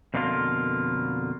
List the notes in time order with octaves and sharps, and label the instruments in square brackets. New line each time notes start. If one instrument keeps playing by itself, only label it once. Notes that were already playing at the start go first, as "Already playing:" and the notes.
[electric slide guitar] F2 B2 D3 A#3 F4